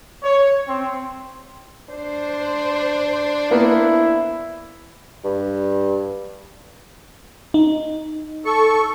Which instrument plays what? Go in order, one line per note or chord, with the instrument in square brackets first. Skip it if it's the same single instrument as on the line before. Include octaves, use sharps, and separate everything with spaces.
[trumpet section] C#5
C4
[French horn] D4 [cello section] C5
[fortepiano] A#3 B3 B4 [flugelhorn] E4
[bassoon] G2
[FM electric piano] D#4
[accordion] A4 C#6